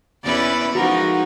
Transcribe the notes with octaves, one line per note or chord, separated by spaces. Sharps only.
E2 C#4 E4 B4 D5
F3 G#3 D#4 F#4 A#4